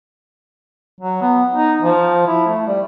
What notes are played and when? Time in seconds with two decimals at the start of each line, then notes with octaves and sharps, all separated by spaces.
1.00 F#3
1.22 B3
1.54 D#4
1.82 F3
2.27 E4
2.47 A3
2.67 G3